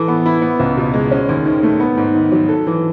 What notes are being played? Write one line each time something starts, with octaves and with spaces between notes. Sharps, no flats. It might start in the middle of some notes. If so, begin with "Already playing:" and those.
Already playing: E3 A4
B3
E4
B3
C#2
B2
G#3
C#4
D#2
D#3
A3
B3
G#2
D#3
F#3
A4
E3